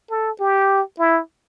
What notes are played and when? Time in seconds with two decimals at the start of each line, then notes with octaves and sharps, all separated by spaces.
0.11 A4
0.40 G4
0.99 E4